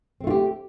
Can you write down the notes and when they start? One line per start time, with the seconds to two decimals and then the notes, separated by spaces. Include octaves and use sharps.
0.21 C4
0.24 A3
0.27 F4
0.30 G4